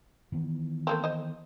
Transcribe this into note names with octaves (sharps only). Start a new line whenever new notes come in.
D#3 E3 B3
A3 A#3 C4
C5 D#5